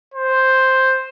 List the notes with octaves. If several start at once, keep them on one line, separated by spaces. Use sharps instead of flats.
C5